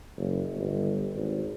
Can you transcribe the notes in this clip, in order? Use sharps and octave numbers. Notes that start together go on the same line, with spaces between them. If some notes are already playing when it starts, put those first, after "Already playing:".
F#1
G1
G#1